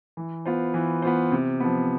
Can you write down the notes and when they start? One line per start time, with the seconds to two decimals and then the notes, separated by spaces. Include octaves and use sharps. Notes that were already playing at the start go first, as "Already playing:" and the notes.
0.17 E3
0.45 B3 F4 C5
0.74 E3
1.02 B3 F4 C5
1.32 C3
1.60 F3 B3